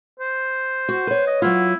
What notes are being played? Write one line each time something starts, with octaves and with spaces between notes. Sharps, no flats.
C5
F#4
B4 C#5
D#5
F#3 B3 E4 F4